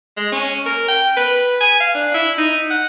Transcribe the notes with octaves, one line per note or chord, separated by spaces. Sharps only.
G#3
C#4
A#4
G5
B4
G#5
F5
D4
E4
D#4
F#5